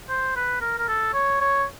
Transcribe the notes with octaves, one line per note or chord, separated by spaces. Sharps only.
C5
B4
A#4
A#4
A4
C#5
C#5